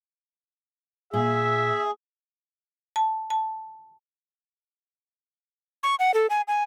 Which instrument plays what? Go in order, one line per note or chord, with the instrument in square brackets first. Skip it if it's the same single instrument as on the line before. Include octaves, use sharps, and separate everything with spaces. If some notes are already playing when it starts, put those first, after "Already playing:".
[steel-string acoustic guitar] A#2 [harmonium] G#4 [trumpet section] E5
[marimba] A5
A5
[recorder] C#6
F#5
A4
G#5
G#5